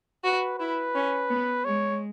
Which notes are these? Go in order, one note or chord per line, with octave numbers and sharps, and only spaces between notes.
F#4 B4
E4 B4
C#4
B3
G#3 C#5